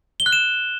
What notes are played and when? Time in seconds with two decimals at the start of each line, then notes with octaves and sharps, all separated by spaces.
0.20 G7
0.26 F#6
0.33 E7